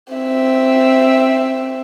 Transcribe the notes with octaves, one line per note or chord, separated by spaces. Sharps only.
C4 E5